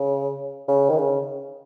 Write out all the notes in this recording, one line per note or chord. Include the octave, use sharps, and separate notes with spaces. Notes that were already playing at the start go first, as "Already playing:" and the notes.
Already playing: C#3
C#3
D#3
C#3